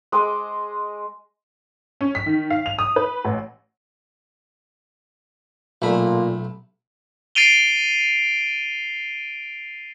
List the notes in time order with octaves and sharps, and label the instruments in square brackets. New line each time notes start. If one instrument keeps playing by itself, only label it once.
[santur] G#3 D#5 D6
[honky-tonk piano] C#4
B6
D#3
F5
F7
D#6
B4
A1
[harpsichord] B1 A3 B5 [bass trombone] A#2
[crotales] A6 C7 D7 D#7 F7 G7